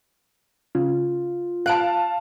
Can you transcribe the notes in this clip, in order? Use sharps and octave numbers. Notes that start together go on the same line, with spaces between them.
C#3 F4
F5 A5 F#6 D7